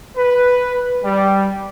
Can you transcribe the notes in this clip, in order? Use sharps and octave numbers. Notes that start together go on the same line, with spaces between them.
B4
G3